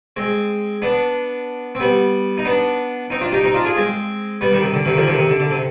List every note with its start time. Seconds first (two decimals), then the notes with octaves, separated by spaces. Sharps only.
0.16 G#3 C4
0.82 B3 D4
1.75 C4
1.80 G3 B3
2.38 D#4
2.45 B3 D4
3.10 C4 D#4
3.21 D4 F4
3.32 D#4 G4
3.44 C4 D#4
3.54 D4 F4
3.65 F4 G#4
3.76 G#3 C4
4.41 G3 B3
4.53 D#3 G3
4.63 C3
4.74 D3
4.85 C3 D#3
4.96 D3 F3
5.07 C3 D#3
5.18 C3
5.30 D3
5.40 D3
5.50 C3